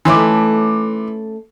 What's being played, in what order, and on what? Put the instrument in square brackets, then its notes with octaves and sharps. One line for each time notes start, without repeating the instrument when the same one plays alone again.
[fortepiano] E3 [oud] A3 C#4 D#4 [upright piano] C6 D6